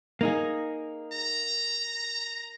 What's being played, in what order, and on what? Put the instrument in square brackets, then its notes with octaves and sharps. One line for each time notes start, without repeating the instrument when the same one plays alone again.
[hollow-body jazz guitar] A#3 D#4 G#4
[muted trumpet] A#5